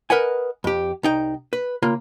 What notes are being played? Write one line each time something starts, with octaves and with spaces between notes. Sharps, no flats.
A#4 B4 D#5 F#5 G#5
F2 G4
C2 D#4 G5
B4
C#3 A#3 F4